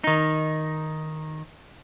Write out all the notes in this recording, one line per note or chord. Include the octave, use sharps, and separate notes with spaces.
D#3 D#4